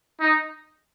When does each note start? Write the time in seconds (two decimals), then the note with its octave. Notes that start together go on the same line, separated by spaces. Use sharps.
0.21 D#4